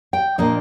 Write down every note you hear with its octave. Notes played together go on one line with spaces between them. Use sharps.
G5
A#2 F3 A#3 D4 D#5